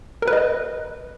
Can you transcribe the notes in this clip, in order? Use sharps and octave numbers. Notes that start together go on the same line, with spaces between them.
A#4
B4
D#5